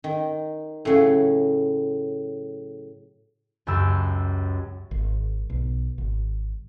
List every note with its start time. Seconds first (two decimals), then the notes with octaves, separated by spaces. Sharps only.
0.04 D#3
0.85 A2 C#3 F#3
3.67 C#2 F#2 G4 E6
4.91 G#1
5.50 B1
5.98 G#1